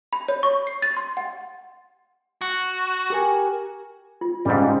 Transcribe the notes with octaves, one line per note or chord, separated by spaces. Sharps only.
B5
C#5
C#6
C7
A6
C6
F#5
F#4
G4 A#4 G#5
F4
G#2 C#3 G3 F5